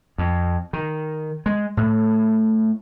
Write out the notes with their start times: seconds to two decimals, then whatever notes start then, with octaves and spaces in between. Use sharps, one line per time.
0.18 F2
0.73 D#3
1.46 G#3
1.77 A2